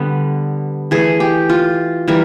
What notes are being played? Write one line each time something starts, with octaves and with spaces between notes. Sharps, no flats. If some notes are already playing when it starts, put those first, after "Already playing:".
Already playing: D3 G3 B3
E3 A3 G#4
G4
F4
E3 G3 A#4